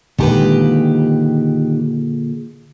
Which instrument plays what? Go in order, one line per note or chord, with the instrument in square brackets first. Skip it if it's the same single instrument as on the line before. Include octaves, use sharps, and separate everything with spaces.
[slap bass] A#2 D3 G#3 [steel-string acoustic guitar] D#3 G4 B4